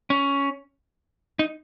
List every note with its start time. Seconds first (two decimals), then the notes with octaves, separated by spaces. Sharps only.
0.10 C#4
1.39 D#4